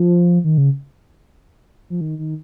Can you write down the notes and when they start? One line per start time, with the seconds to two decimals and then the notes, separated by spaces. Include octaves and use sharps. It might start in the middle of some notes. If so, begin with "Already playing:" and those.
Already playing: F3
0.44 D#3
0.58 C#3
1.90 F3
2.01 D#3
2.19 D#3